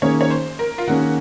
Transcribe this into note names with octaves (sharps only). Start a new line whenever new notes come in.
D#3 A#3 C#4 G#4 C#5
C#5
C5
A#4
F4
D#3 A#3 C#4 F#4 G#4